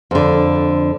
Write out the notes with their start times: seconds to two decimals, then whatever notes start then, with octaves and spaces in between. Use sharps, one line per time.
0.11 F2 D3